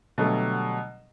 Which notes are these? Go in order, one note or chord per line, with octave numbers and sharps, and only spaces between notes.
B2 D3 F#3 G3 A3